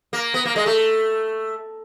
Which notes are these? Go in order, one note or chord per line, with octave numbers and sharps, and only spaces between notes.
A#3
B3
A#3
G#3
A3